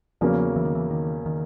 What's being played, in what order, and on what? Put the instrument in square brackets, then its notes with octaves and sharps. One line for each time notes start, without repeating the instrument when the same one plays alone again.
[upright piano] E2 C#3 F#3 A#3 C#4 [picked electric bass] F3
[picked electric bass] E3
D#3
E3
D#3
D#3